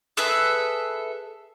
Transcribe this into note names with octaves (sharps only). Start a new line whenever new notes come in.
G#4 A4 B4 E5